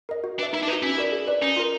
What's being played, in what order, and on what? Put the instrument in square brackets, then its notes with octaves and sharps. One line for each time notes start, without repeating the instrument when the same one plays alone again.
[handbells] A#4 D#5
F#4
[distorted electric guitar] D4 [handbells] B4 E5
[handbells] D#4 [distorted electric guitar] E4
[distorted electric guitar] D4
[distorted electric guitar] D#4 [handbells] B4
[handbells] F#4
[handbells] C#4 [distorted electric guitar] E4
[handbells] F#4 A#4 D5
G#4
B4 D5
[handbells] C#4 [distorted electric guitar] D#4
[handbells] F4 A#4